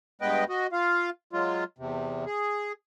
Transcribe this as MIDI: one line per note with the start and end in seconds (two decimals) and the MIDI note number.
0.21 0.44 43
0.21 0.44 56
0.21 0.44 59
0.21 0.44 71
0.21 0.44 75
0.21 0.44 79
0.49 0.67 66
0.49 0.67 75
0.73 1.10 65
0.73 1.10 77
1.33 1.64 54
1.33 1.64 56
1.33 1.64 65
1.78 2.25 40
1.78 2.25 48
2.26 2.72 68